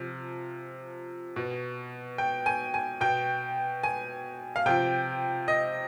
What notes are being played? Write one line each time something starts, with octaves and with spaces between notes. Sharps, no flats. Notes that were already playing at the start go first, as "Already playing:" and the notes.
Already playing: C3 F3
B2
G5
G#5
G#5
B2 G5
G#5
F5
C3 F3 G5
D#5